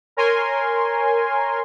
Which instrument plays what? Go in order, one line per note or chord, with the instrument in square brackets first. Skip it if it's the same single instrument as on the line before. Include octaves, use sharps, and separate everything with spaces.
[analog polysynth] A#4 C#5 G#5 C6